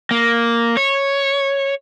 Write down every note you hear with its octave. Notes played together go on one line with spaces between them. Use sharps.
A#3
C#5